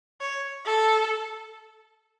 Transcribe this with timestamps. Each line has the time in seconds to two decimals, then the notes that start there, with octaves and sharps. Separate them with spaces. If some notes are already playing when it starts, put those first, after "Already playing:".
0.21 C#5
0.65 A4